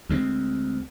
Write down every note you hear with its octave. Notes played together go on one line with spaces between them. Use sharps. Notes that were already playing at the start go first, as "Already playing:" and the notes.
D2 G#3 A#3 C4